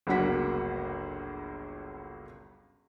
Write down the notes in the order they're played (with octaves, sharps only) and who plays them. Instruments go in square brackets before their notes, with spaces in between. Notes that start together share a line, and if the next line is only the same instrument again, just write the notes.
[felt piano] G1 C#2 F#3 A#3 F#5 B6